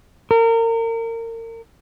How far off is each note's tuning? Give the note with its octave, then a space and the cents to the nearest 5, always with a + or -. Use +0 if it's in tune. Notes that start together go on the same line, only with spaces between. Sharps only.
A#4 -30